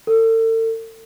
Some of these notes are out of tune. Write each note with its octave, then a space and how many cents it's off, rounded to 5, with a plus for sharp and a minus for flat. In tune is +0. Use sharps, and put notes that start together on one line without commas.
A4 +40